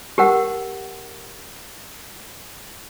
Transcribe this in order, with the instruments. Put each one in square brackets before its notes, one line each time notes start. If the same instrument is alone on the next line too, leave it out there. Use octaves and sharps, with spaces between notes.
[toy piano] G4 A#4 F#5